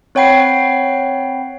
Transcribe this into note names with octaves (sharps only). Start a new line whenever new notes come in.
C4 C#5 F#5 G5 B5 C7